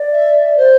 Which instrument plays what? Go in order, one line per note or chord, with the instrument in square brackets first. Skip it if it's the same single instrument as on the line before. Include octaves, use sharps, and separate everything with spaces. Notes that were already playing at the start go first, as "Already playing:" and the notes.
Already playing: [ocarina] D5
[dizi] E5
C5